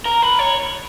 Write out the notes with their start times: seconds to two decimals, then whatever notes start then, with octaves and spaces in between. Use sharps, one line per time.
0.05 A#4
0.22 B4
0.39 C#5